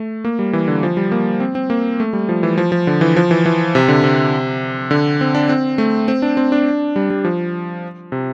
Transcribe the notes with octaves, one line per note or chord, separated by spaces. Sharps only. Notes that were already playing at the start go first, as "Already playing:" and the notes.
Already playing: A3
A#3
G3
E3
D3
F3
G3
A#3
C4
C4
A#3
A3
G3
F3
E3
F3
F3
D3
E3
F3
E3
E3
C3
D3
C3
D3
C4
D4
C4
A3
C4
D4
C4
D4
G3
G3
F3
C3